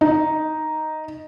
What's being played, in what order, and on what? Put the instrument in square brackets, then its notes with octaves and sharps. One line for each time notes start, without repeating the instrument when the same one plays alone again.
[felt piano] D#4